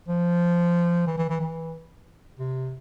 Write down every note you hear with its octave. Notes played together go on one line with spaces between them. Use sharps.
F3
E3
E3
E3
E3
C3